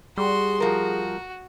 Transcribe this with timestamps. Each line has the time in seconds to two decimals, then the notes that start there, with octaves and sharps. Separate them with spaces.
0.18 G3 F#4 G#4 C6
0.60 F3 F#4 A#4